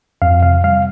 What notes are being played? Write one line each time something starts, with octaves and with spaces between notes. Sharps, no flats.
F2 F5
C3 F5
G3 F5